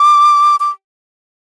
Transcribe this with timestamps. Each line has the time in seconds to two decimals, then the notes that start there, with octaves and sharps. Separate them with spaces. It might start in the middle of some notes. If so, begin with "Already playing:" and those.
Already playing: D6
0.60 D6